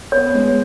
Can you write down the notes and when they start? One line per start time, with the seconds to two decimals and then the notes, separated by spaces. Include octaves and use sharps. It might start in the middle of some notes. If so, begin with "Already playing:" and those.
0.12 B3 C#5
0.27 B3
0.34 G#3